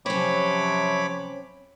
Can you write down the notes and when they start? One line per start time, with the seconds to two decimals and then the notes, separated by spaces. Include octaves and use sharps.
0.06 C3 F3 F#3 C4 C#4 C#5 B5 D6